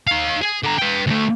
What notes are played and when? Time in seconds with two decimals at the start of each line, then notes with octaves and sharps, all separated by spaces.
0.07 D#4 F5
0.42 G#4
0.63 D3 A#5
0.78 B4 G5
1.07 D2 A3